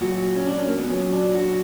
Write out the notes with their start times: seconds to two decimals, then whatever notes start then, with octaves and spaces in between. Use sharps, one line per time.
0.01 A#2 F#3 F#4
0.36 C#4
0.46 D4
0.57 C#4
0.68 A#3
0.78 B3
0.90 A#2 F#3 C#4
1.13 D4
1.35 F#4